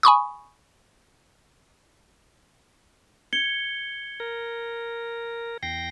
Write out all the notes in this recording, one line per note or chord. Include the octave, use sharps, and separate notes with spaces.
G#5 B5 C#6 D#6
G#6 C#7 G7
A#4
E2 G5 A#6 C7